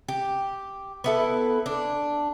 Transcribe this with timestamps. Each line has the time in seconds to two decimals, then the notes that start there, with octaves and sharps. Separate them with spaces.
0.08 G4
1.04 B3 E4 A4
1.66 D4